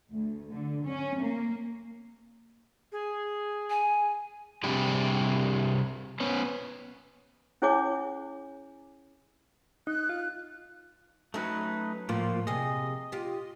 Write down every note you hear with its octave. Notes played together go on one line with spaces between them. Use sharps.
D2
D3
C#4
A#3
G#4
G#5
C3 G3 D4 G4 G#4
B3 C#4
C#4 E4 G#4 C#5 G#5 D6
D#4 F#6
F4
F#3 A3 C#4 D#4 B4
A2 F3 A#3 F4
C3 G#4 D#5
F4 G4